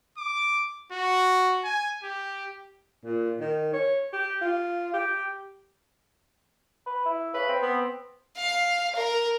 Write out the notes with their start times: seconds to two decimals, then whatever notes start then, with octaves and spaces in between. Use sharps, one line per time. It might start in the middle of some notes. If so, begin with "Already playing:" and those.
0.18 D6
0.92 F#4
1.64 G#5
2.04 G4
3.04 A#2
3.40 D#3
3.73 C#5
4.13 G4
4.41 F4
4.94 G4
6.86 B4
7.05 E4
7.34 C#3 B4
7.49 C4
7.62 B3
8.37 F5
8.96 A#4